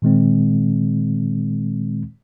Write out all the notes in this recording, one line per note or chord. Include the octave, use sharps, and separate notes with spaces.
A#2 D#3 G#3 C4